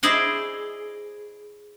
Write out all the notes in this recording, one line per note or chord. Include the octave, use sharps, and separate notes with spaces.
E4 G#4 C5 D5 D#5 G#5